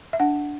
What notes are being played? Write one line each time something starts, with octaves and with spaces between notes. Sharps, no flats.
E5
D4 F#5